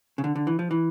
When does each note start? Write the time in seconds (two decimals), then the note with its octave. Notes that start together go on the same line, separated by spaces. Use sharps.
0.18 C#3
0.24 D3
0.36 D3
0.47 E3
0.59 F3
0.71 E3